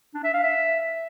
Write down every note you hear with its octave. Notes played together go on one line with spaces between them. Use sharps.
D4
E5
F5
E5